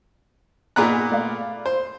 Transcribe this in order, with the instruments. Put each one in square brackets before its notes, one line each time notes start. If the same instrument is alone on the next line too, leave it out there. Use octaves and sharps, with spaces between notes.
[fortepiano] A#2 B3 F#6 [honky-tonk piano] D#4 G#4 A#5
[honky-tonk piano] A3 D5 F5
[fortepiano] C5 [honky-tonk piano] C6